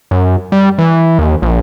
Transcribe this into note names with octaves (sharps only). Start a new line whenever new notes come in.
F#2
G3
E3
D#2
A#1